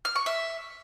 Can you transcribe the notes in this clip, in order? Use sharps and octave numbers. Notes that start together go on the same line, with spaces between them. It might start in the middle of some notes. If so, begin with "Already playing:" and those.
F6
C#6
E5